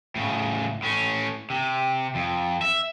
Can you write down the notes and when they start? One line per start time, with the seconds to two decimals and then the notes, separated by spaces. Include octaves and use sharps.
0.15 A2 C#3
0.82 A2 C#4
1.50 C3
2.15 F2
2.62 E5